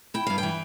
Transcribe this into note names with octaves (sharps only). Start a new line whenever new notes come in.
E4 G5
G2 F5
G5
E3